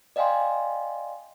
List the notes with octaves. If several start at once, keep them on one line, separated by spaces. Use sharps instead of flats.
D5 D#5 F5 G5 G#5 C6